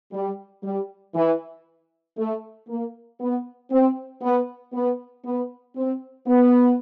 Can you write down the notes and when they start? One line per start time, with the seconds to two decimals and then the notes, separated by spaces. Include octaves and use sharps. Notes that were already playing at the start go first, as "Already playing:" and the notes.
0.13 G3
0.63 G3
1.15 E3
2.18 A3
2.69 A#3
3.20 B3
3.71 C4
4.22 B3
4.73 B3
5.25 B3
5.76 C4
6.27 B3